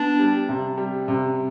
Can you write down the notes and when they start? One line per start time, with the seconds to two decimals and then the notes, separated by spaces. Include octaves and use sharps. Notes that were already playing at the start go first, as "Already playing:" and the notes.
Already playing: B3 D4
0.19 G3
0.49 C3
0.78 G3
1.08 C3